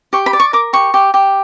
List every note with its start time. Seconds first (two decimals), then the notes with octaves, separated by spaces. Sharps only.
0.13 G4 C#6
0.26 B5
0.33 D5
0.40 C#6
0.53 A#4 D6
0.73 G4 C#6
0.94 G4
1.14 G4